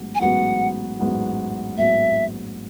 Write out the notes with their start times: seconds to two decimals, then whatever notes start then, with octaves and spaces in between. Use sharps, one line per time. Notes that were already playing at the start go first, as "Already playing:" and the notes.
Already playing: A1 G#2 F#3 B3
0.15 G#5
0.20 A1 G#2 F#3 B3 F#4 F#5
0.99 A1 G#2 F#3 B3 F#4
1.78 A1 G#2 F#3 B3 F#4 E5